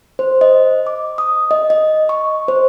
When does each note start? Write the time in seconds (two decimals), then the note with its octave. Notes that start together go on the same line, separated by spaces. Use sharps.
0.19 C5
0.41 D#5
0.87 D6
1.18 D#6
1.51 D#5
1.70 D#5
2.09 C#6
2.48 C5